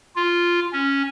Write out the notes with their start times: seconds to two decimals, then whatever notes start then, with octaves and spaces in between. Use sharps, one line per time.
0.16 F4
0.72 C#4